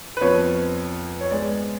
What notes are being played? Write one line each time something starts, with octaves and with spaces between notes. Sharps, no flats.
B4
F2 F3 B3 C#5
C#5
G#2 G#3 B3 D5